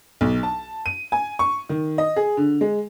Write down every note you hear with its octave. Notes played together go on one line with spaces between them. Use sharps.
B1
A5
D#7
G#5
C#6
D#3
D#5
G#4
D3
G#3